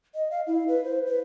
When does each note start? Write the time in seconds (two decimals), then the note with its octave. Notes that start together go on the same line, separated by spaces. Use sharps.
0.15 D#5
0.31 F5
0.47 E4
0.68 B4
0.84 C5
1.07 B4